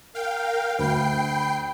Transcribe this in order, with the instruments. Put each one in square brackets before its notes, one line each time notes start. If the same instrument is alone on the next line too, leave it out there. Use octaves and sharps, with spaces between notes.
[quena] A#4 [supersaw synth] F5 G5
[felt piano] D2 [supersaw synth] G5 C7 [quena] B5